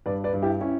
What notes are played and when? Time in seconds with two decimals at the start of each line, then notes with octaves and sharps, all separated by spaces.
0.06 G2 B4 D5
0.24 B4 D5
0.34 G2
0.42 E4 G4
0.61 C#4 E4